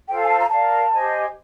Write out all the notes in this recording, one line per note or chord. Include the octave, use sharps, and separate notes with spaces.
F4 A4 C5 F5 G5
G#5
A5
A#5
A#4 D5 F5 A5
G4 C5 D#5 G#5